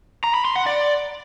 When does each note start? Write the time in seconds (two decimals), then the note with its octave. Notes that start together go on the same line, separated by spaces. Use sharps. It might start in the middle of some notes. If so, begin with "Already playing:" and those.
0.24 A#5
0.34 B5
0.45 C6
0.56 F#5
0.66 D5